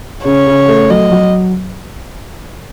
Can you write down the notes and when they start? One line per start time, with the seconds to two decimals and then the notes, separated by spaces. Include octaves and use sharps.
0.25 C#3 C#5
0.47 C#3
0.68 A3
0.90 F#3 D#5
1.12 F#3